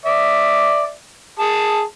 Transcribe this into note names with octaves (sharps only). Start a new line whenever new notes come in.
D5 E5
G#4 A5